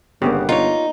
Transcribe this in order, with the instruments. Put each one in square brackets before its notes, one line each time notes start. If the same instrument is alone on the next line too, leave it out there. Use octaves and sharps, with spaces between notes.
[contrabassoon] G1 [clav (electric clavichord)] C#3 [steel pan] A#3 B3 G4
[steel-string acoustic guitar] D#4 [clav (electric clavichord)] F4 C#5